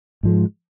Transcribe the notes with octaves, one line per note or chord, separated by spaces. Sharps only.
G#2 F3 G#3